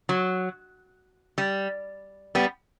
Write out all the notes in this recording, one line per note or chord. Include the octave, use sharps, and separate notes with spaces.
F#3
G3
G3 B3